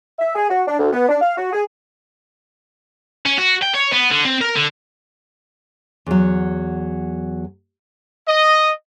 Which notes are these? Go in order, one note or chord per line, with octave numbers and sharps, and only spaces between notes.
E5
G#4
F#4
D4
D2
B3
D4
F5
F#4
G#4
C#4
F#4
G5
C#5
B3
D3
C4
A#4
D3
E2 F#3
D#5